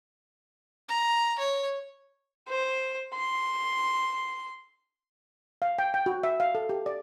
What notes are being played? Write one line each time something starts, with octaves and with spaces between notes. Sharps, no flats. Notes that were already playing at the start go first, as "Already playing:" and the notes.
A#5
C#5
C5
C6
F5
G5
G5
F#4
E5
F5
A4
G4
D5